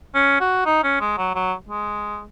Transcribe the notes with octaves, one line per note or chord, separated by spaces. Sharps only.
C#4
F#4
D#4
C#4
G#3
F#3
F#3
G#3